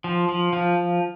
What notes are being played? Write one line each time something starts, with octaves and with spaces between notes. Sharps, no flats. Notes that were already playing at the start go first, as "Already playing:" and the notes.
F3
F3
F3